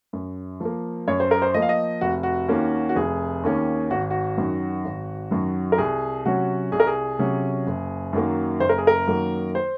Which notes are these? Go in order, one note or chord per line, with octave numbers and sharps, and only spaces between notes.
F#2
F3 A#3
F#2 C#5
C5
A#4
C5
F3 A#3 D#5
F5
D#5
F1 F#4
F#4
D#2 D#3 A#3 C#4
F#4
F1 G#4
D#2 D#3 A#3 C#4
G#1 F#4
F#4
F#2 D#3 F#3
G#1
F#2 D#3 F#3
A#4
C2 G#4
C3 F#3 C#4 F#4
C2 G#4
A#4
G#4
C3 F#3 C#4
F#1
F#2 D#3 F#3 A#3
F#1 C5
A#4
G#4
A#4
F#2 D#3 F#3 A#3
C5